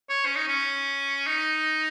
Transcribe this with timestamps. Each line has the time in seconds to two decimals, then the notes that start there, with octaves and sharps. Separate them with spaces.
0.10 C#5
0.26 C#4
0.36 D#4
0.48 C#4
1.27 D#4